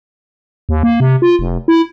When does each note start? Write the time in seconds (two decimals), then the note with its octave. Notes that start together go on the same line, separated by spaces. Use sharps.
0.69 D#2
0.83 A#3
1.00 C3
1.22 F4
1.39 F1
1.68 E4